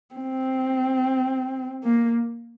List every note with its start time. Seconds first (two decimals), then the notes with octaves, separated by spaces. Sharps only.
0.15 C4
1.84 A#3